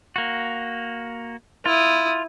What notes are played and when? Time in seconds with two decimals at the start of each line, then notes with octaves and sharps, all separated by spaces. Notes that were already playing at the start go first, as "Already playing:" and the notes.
0.16 A#3 F#4
1.66 E4 F4 D#6